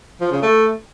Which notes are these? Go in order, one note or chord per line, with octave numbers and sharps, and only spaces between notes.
F3
C#3
A3